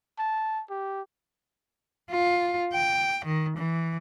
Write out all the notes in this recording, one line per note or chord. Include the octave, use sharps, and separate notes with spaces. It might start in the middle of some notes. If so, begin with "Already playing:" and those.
A5
G4
F4
G5
D#3
E3